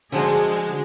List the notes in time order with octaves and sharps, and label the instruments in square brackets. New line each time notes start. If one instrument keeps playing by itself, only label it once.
[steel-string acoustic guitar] D3 F3 F#4 [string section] G#3 [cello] D4 G#4